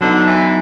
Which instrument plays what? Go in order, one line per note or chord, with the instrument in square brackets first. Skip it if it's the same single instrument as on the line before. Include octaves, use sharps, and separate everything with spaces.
[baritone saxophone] D3 [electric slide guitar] F#3 B3 D#4
[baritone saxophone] E3